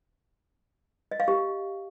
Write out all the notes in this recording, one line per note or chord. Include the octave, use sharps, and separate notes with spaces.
D#5
F5
G4